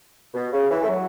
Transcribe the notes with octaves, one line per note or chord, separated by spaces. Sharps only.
B2
C#3
E3
A3
F#3